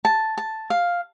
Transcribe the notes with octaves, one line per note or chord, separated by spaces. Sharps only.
A5
A5
F5